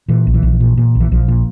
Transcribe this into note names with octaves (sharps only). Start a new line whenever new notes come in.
A#2 E3
A#1
E3
A#1
A#2
A#2
A#1
E3
A#1 F3
A#2